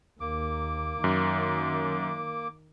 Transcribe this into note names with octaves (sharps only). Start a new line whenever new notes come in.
D#2 A#3 D6
F#2 D#3